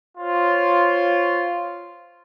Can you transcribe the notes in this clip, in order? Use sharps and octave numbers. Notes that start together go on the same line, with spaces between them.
F4 C5 C#5